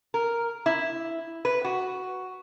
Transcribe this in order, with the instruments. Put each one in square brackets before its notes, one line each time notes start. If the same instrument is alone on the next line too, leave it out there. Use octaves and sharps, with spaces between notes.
[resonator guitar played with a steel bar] A#4
E4
B4
F#4